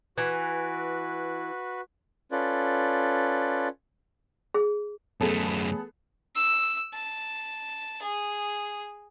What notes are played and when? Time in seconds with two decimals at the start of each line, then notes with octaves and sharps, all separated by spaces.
0.18 E3 F#4 B4
2.32 C#4 F4 A4 B4 D5
4.54 G#4
5.21 F#2 A3 B3 G#4 A4
6.36 E6
6.93 A5
8.02 G#4